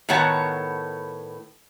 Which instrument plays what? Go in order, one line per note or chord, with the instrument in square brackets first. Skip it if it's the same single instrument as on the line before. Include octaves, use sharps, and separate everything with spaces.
[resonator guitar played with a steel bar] A2 D#3 B3 C#5 F#5 A5